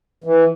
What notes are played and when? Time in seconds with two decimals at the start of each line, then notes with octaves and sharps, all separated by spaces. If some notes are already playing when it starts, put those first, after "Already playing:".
0.24 E3